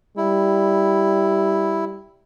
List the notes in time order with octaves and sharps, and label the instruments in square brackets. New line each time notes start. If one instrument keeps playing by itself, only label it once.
[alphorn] G3 [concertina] E4